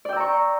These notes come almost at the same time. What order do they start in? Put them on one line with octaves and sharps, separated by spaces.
D5 G5 E6 A#5 C#6